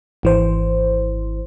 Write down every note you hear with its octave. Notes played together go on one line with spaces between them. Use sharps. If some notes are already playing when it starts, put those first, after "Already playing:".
G#1 E3 C5